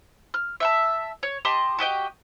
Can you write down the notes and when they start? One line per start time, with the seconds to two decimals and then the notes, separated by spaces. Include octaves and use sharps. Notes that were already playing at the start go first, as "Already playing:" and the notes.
0.34 F6
0.60 E5 F#5 A5
1.23 C#5
1.45 G4 D#5 A5 C6
1.79 F#4 G4 D#5 G5